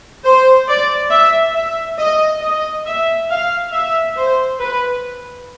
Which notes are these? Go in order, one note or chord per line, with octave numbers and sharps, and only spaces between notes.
C5
D5
E5
E5
D#5
D#5
E5
F5
E5
C5
B4